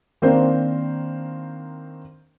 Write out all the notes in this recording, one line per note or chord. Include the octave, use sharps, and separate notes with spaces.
D#3 A#3 C4 D4 A#4 C5